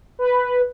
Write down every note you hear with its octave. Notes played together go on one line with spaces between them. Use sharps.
B4